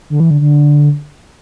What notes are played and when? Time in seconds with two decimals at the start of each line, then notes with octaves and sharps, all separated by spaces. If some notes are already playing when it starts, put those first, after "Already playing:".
0.10 D3
0.20 E3
0.31 D3
0.41 D3